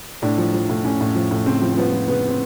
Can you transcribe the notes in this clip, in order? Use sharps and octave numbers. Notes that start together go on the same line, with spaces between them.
A2 D4
F3
F3
A2
A2 C#4
A2
F3
A2
C#3 C4
F3
C4
F3 B3
F3
C#3 B3
C4